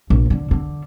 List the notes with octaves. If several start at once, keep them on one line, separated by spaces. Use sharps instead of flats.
A#1
D3
D3